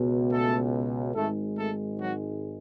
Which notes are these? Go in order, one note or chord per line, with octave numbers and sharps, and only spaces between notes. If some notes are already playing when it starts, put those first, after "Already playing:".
Already playing: C#2 B2
A3 A4
G#1 G#2 G#3 A3 A4
A3 A4
F#3 F#4